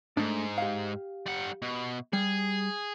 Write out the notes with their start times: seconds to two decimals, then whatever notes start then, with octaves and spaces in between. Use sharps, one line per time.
0.17 G#2 A3 D4
0.58 G4 F5
1.26 G3 F#5
1.62 B2
2.13 G3 G#4